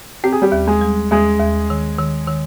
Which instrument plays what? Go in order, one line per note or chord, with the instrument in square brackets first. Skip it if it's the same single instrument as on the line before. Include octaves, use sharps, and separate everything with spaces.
[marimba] C4 [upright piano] G4
[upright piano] G#4
G3 G4
[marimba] D#2
[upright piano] G#3 G#4
[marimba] G3
[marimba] D#2 [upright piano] G#3 G#4
[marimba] D#2
D#3
D#3
D#3